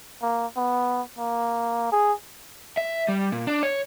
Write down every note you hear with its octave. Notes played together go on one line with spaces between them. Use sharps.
A#3
B3
A#3
G#4
E5
G3
A#2
D4
C#5